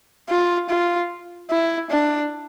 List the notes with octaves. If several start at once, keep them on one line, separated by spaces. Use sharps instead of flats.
F4
F4
E4
D4